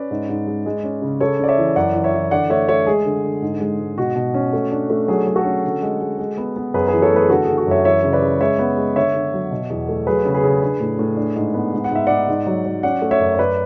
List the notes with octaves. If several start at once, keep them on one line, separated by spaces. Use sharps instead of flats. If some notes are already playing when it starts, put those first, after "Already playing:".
Already playing: C#4 B4 D5
G#2
G#2
G#3
G#3
C#4
C#3
C#3 A4 C#5
C#4 D5
C#5 E5
E3
F#2 D5 F#5
E3
C#5 E5
E3
D3 D5 F#5
A3 C#5 E5
A3 C#5 E5
G#3 G#4
D3
D3
G#2
G#3
G#2
B2 F#4
B2
C#4
A3
D4
A3
F#3 G#4
F#3
F#4 A4
C#4
D3
G#3
G#3
G#3
B3
B3
F#2 G#4 B4
E3 G#4 B4
A4 C#5
A3
G#4 B4
D3 F#4 A4
G#4
D3
F#4
F#2 C#5 E5
E3 C#5 E5
C#3
B4 D5
C#3
G#3 C#5 E5
B3
G#3
D3 C#5 E5
D3
F#3
B2
E2
A3
F#3 G#4 B4
C#3
G#4 B4
C#3
D4
A2
A2
D4
G#2
B3
G#2
F#5
G#2 E5
G#2 D5 F#5
G#2
F#3
F#3
C#4 D5 F#5
A3
C#5 E5
F#2
C#5
F#2 B4 D5